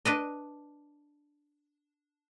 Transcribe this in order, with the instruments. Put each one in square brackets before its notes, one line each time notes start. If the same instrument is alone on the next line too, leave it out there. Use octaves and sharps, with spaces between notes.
[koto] D4 B4 D#5